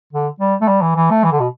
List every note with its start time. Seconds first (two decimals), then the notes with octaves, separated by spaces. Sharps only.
0.13 D3
0.40 G3
0.61 A3
0.68 G3
0.82 E3
0.96 E3
1.10 A3
1.24 E3
1.32 D3
1.40 B2